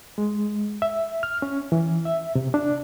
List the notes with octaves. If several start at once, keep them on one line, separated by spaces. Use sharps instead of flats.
G#3
E5
F6
C#4
E3
E5
C3
D4